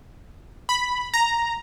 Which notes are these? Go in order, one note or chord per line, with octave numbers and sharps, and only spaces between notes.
B5
A#5